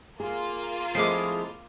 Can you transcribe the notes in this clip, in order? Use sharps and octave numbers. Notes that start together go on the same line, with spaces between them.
A#3 F4 G#4
F3 G#3 A3 C4 E4 D6 C7